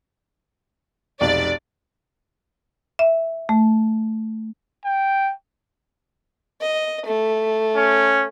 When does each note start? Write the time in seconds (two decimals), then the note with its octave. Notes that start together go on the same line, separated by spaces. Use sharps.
1.21 F1 B1 D5
2.99 E5
3.49 A3
4.85 G5
6.61 D#5
7.05 A3
7.76 C#4